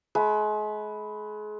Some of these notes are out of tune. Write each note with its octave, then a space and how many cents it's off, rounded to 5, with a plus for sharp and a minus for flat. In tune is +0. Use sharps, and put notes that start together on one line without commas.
G#3 +35 B5 +0